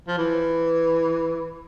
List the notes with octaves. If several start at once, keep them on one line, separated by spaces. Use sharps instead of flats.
F3
E3